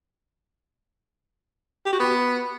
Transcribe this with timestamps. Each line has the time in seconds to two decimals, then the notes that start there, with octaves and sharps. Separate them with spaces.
1.85 G4
1.92 F#4
1.99 B3